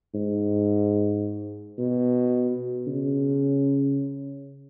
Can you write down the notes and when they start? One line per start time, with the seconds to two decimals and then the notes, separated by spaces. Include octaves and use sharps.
0.14 G#2
1.78 B2
2.87 C#3